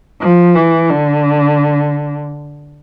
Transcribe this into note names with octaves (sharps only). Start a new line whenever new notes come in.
F3
E3
D3